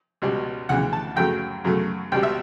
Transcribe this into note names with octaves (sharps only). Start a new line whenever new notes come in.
C#2 B2 G3
D2 C#3 E3 F#5
A5
F#2 C#3 F#3 A3 G5
F#2 C#3 F#3 A3
C#2 B2 G3 G5
E5